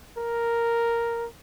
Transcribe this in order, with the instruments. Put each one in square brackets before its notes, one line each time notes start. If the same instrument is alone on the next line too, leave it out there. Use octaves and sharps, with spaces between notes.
[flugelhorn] A#4